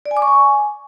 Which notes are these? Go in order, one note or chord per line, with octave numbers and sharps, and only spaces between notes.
D5
G#5
D6
C#6
G#5